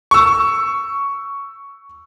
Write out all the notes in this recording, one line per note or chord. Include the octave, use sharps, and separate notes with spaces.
C#6 E6